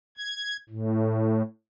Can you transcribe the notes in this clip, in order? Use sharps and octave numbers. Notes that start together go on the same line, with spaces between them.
G#6
A2